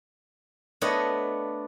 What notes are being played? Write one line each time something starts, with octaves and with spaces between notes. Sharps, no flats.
A3 B3 D4 C#5 D#5